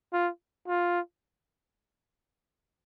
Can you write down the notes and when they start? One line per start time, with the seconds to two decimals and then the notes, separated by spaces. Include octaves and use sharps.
0.13 F4
0.68 F4